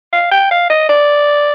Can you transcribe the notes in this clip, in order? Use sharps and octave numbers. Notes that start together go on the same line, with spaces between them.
F5
G5
F5
D#5
D5